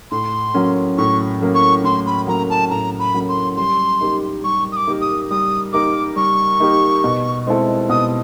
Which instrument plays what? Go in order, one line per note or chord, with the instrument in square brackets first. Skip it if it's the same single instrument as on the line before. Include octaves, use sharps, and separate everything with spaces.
[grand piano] A2 [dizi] C6
[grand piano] F#3 A#3 C#4
[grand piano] A2 [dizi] C#6
[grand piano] F#3 A#3 C#4
[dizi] C#6
[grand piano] A2 [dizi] C6
[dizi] B5
[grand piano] F#3 A#3 C#4 [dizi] A#5
[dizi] A5
[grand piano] A2 [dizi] A#5
[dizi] B5
[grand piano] F#3 A#3 C#4
[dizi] C6
[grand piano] G3 [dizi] C6
[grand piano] A#3 D#4 G4 A#4
[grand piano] G3 [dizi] C#6
[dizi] D#6
D6
[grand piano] A#3 D#4 G4 A#4
[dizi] D#6
[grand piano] G3 [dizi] D#6
[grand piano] A#3 D#4 G4 A#4 [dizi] D6
[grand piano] G3 [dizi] C#6
[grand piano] A#3 D#4 G4 A#4
B2
G#3 C4 E4 A4
[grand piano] B2 [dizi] D#6